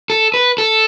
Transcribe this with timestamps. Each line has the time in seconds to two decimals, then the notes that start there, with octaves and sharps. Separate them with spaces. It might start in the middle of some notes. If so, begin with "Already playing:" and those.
0.10 A4
0.34 B4
0.58 A4